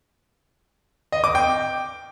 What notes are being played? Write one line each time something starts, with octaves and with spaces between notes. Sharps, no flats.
D#5
D6
G5